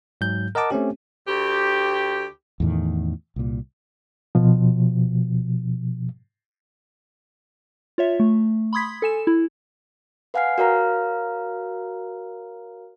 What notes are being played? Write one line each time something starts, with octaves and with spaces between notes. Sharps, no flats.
G#2 F#3 G6
A#4 D#5 F#5 A5 D6
A3 C4 C#4 G4
D2 G4
E2 A2 D#3
C2 A#2
B2 F3
F4 C#5 E5
A3
B5 C6 D#6 G#6 B6
A4 G#5 E7
E4
B4 F5 F#5 G#5 F6 C7
F#4 A#4 C#5 F5 A#5 F6